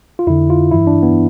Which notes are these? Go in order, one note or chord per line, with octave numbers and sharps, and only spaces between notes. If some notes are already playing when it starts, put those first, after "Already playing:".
F4
F2 D3 E4
F4
G2 E3 E4
D4
B3